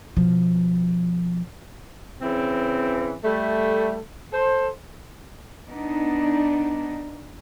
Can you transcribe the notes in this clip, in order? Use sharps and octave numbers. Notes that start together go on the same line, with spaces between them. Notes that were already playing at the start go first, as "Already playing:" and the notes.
B2 F3
C#3 E3 C4
G3 A3
A4 C5
B3 D4 D#4